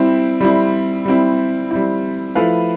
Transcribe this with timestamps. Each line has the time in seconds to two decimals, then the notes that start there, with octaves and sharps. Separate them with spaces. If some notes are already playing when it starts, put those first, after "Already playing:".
Already playing: G3 C4 E4
0.41 G3 C4 E4
1.05 G3 C4 E4
1.71 G3 C4 E4
2.35 F3 A3 E4 B4 F5